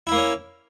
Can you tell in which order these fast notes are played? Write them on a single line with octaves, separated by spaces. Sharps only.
E4 A#3 C#4